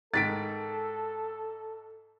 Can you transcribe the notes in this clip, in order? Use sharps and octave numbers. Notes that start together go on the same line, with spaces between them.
G#2 D#3 A4 A6 B6 D7